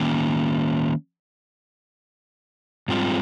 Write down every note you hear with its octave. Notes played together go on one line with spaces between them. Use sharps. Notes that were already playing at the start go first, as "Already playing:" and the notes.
Already playing: D#3 A#3 C#4
G#2 G3 C4 F4